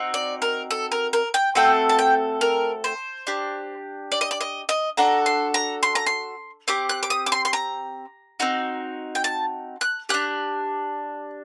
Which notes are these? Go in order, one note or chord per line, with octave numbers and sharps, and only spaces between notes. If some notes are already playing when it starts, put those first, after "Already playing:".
Already playing: C4 D#4 F#4
D5
A#4
A4
A#4
A#4
G5
A3 C4 F#4 A4 G5
A5
G5
A#4
C5
D4 G4
D5
D#5
D5
D#5
D#5
D4 F#4 A4 A#5
C6
A#5
C6
A#5
C6
C4 G4 D6
F#6
D6
D#6
D6
C6
C6
A#5
C4 D#4 F#4
G5
A5
F#6
D4 G4 F#6